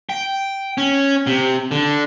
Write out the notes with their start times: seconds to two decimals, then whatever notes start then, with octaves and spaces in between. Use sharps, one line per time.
0.09 G5
0.78 C#4
1.27 C3
1.71 D3